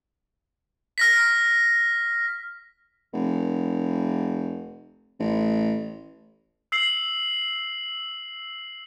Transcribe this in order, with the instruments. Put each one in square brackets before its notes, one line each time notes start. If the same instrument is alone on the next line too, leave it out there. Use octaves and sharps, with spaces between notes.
[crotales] F6 A#6 B6
[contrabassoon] F1
A1
[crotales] E6 C7 F#7